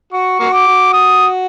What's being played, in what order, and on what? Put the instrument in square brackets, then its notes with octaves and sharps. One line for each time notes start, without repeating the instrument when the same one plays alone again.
[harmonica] F#4 [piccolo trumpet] C#6
[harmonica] A#3 F#4
[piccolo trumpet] D6
[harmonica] F#4
[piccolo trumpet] D#6